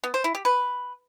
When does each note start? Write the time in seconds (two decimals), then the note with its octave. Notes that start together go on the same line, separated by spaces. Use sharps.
0.04 B3
0.14 C5
0.24 E4
0.35 G4
0.45 B4